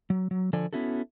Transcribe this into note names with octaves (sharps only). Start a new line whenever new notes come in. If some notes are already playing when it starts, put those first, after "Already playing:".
F#3
F#3
D3 F3 A4 D5 G#5
B3 C#4 E4 F#4 A4